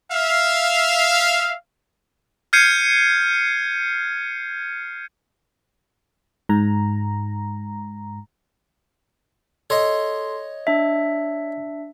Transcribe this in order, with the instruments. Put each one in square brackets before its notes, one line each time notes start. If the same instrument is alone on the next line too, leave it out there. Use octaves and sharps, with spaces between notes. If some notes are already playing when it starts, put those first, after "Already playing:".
[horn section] E5 F5
[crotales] F6 G6 G#6 C7 C#7 D#7
[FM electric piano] G#2 A#5
[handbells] A4 C6 [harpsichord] C#5 D#5
[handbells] D4 E5